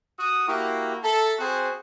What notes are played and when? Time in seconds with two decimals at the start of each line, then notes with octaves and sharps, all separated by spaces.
0.18 F#4 D#6
0.48 A#3 E4 F#4 G4
1.03 A4 E5 A5 A#5
1.39 C4 F#4 G#4 C5